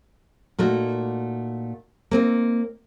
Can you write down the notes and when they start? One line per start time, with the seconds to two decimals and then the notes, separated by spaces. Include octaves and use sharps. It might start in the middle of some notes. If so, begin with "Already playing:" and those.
0.58 A#2 A3 D#4 F#4
2.11 A#3 C4 D#4